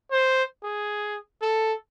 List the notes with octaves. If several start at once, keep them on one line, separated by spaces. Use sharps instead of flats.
C5
G#4
A4